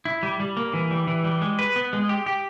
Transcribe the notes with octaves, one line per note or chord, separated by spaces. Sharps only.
E4
G3
G3
A#3
E3
G3
E3
G3
G#3
B4
B3
G#3
G4
G4